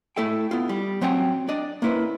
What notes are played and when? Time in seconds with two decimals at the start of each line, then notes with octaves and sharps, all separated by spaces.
0.16 A3 E4 A4 E5 G5
0.51 B3 E4 F4
0.69 G3
1.01 F#3 C4 C#4 F#5 G5
1.48 D4 D5 D#5
1.82 A#3 C#4 E4 B4 C5